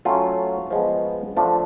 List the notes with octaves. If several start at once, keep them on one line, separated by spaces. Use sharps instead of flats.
F#3 A3 C#4 F4
F3 G#3 B3
D3 F3 A3 D4 F4